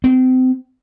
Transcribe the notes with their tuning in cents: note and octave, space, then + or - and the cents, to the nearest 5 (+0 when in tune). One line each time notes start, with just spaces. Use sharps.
C4 -30